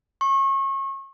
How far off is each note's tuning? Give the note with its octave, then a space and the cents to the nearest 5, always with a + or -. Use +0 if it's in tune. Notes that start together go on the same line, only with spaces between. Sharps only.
C#6 -30